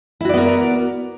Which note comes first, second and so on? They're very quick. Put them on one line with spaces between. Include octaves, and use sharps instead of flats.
E4 F#4 D5 B3 A#4